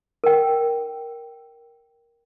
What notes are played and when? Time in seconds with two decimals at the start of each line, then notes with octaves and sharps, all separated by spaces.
0.24 A#4 G5